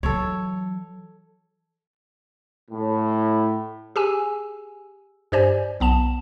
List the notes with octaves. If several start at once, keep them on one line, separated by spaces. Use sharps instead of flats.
E3 F#3 A4 C#5
A2
G4 G#4 G#5 E6
G2 G4 C5 D5 G#5
B1 B3 A5 E7